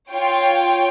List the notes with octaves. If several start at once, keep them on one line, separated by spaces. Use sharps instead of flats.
F4 C#5 G5